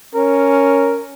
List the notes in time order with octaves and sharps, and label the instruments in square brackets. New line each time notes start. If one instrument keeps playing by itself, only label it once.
[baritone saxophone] C#4 [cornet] A#4